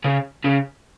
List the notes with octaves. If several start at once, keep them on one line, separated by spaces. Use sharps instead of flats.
C#3
C#3